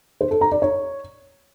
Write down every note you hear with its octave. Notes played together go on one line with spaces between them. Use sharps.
C5
A4
A#5
D5
C#5